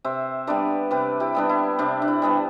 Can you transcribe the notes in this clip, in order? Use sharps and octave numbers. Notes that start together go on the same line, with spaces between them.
C3 C5 E5
G3 B3 D4 B4 D5
C3 G4 B4
E4 G4
G3 B3 D4
E4
C3 D4
D4
E4
G3 B3 D4